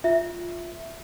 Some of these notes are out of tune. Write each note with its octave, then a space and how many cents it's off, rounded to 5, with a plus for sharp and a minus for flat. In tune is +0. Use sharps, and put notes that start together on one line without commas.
F4 +0 E5 +0